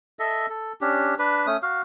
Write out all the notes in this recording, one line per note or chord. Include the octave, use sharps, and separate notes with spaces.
A4 D#5 E5
A4
C#4 D4 G4
D4 B4
A3 C#4 D#6
F#4 F5